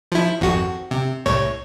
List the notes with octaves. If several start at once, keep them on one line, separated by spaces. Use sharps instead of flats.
F3 E4
G#1 F2 F#4
C3
C2 A2 C#5